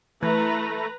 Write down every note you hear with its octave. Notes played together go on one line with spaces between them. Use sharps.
E3 A3 B4 A#5 B5